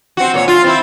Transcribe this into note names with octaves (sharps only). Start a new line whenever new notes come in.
C4 F#4
A#2 C#5
F4
C4 E4